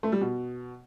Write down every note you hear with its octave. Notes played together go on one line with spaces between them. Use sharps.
A3
G3
B2